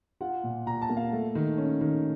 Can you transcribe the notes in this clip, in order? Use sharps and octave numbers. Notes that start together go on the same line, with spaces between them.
F4 F#5
A#2
A#2 A#5
A5
A#3
F5
A3
D#3
C#4
D#3